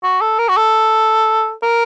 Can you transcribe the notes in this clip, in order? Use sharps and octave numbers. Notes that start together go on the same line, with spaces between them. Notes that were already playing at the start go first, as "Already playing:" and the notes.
F#4
A4
A#4
F#4
A4
A#4